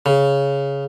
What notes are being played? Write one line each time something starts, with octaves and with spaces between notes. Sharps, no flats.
C#3